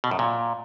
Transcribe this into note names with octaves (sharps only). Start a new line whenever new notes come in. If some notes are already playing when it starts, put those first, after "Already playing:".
B2
F#2
A#2